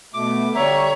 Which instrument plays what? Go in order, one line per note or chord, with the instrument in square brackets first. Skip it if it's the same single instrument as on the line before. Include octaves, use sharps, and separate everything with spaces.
[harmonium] B2 A3 [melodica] D6
[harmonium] D3 G3 [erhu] C#5 [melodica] E5 [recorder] A#5